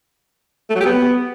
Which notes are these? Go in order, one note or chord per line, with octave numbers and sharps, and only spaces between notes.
A3
F#3
G4
B3